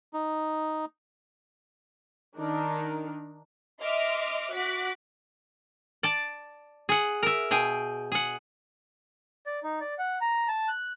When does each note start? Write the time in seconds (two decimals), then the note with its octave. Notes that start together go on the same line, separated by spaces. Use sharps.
0.13 D#4
2.36 D#3 D4 D#4 A#4
3.80 D#5 E5 C6 D6 F6
4.53 F#4 D6 F#6 B6
6.03 D5 A5
6.89 G#4 F#5
7.23 A#4 E5
7.51 B2 G#4 G5
8.12 G#4 F#5
9.46 D5
9.63 D#4
9.81 D5
9.99 F#5
10.21 A#5
10.48 A5
10.68 F#6